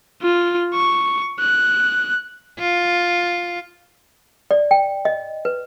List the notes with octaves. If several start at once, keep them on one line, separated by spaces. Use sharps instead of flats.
F4
C#6
F#6
F4
D5
G5
D#5
B4